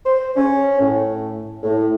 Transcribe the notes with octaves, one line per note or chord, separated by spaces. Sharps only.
C5
C#4
A2
A2